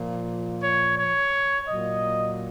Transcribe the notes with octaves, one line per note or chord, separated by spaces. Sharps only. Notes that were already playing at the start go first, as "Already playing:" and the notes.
Already playing: A#2 F3
C#5
C#5
A#2 F#3 D#5